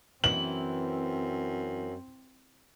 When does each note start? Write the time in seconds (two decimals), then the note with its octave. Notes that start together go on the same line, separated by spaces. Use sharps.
0.24 F#2 E3 C4 F#7